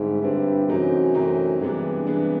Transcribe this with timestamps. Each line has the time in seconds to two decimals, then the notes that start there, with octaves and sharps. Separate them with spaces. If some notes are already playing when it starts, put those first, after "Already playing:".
Already playing: G#2 D3 G3 C4 E4
0.22 G2 D3 G3 C4 E4
0.68 F#2 C3 E3 A3 C4 D#4
1.15 C3 E3 A3 C4 D#4
1.60 G2 C3 E3 G#3 B3 D4
2.07 C3 E3 G#3 B3 D4